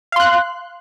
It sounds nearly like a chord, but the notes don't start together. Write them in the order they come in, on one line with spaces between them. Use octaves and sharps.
F5 C6 F#6